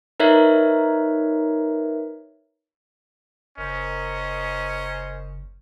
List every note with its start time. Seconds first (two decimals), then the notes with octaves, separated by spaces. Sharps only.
0.20 D#4 A#4 B4 C#5 E5
3.57 F#1 C#4 A#4 C5 D#5